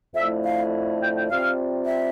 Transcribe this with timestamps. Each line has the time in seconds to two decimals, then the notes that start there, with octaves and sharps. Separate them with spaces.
0.15 F2 D3 A3 E4 E5
0.44 F5
1.01 G5
1.16 G5
1.29 C3 G3 C4 F4 F5
1.86 E5